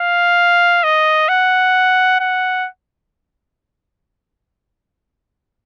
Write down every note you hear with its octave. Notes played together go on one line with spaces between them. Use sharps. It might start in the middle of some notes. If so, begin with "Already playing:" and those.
Already playing: F5
D#5
F#5
F#5